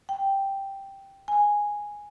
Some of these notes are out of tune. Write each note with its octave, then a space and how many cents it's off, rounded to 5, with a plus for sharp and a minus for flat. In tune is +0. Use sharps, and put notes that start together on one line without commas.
G5 +0
G#5 -5